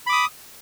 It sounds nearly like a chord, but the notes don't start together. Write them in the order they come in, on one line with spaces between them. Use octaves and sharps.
B5 D6 D#6